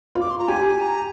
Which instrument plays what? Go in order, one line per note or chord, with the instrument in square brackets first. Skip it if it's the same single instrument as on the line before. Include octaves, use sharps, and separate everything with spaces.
[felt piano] F4
[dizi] D6
C6
A#5
[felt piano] G4 [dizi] G#5
[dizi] A#5